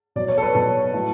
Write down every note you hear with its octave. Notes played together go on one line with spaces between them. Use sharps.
B2 F#3 D5
C#5
A4
B4
B2 F#3 A4
A2 F#3